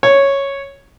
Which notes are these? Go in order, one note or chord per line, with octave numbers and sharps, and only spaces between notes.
C#5